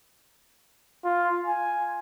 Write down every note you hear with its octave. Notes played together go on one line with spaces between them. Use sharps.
F4
G#5